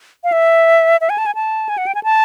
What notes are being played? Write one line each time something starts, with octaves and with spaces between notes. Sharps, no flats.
F5
E5
E5
G#5
A5
G#5
A5
G#5
F#5
G5
G#5
A5